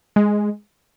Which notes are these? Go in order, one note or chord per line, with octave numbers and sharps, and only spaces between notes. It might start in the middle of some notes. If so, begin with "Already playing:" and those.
G#3